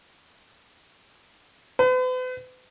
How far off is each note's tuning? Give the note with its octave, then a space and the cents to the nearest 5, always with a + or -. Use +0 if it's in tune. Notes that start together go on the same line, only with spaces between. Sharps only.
B4 +45